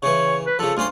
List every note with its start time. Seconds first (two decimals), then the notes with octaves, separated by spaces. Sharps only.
0.03 C#3 E3 C#5
0.47 B4
0.59 C#3 F3 A4
0.77 D2 C#4 F4 C6